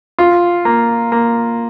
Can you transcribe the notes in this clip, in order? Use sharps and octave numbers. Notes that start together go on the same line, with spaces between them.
F4
A#3
A#3